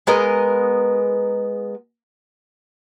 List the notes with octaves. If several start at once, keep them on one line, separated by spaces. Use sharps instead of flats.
G#3 B3 A#4 D#5